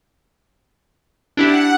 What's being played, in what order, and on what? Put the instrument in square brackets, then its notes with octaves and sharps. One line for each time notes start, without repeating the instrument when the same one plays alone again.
[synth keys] D4 E4 G4 [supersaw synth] F#5